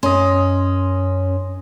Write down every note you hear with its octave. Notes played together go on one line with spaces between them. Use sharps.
F#2 C#4 D#5 C6